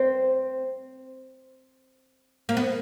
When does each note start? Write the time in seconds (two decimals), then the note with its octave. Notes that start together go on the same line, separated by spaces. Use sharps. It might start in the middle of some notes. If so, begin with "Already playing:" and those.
Already playing: C4
2.49 A#3
2.57 B3